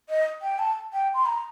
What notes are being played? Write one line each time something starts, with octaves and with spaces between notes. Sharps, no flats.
D#5
G5
A5
G5
C6
A#5